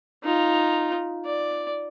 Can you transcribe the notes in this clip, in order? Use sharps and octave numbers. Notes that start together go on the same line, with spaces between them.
D#4 F4
D5